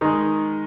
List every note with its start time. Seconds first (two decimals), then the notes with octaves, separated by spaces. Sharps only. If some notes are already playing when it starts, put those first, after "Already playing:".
0.01 D#3 G#3 D#4